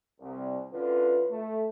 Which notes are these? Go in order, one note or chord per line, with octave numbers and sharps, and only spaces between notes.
C2
D3 C#4 E4 F4 B4
A3